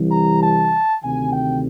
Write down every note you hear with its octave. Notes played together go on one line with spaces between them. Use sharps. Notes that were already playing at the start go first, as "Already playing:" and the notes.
Already playing: C2 C3 E3 G3
A#5
A5
D2 C3 D#3 G#5
G5